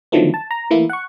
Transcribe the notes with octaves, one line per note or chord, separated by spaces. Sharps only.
D3 D#3 F3 F#3 A3 B3
A5
A#5
E3 A3 A#3 E4
F#5 C#6